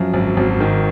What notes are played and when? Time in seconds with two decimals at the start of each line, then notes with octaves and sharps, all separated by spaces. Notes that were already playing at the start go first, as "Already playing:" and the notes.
Already playing: F#2 F3
0.13 G#1
0.37 G#1
0.60 D#3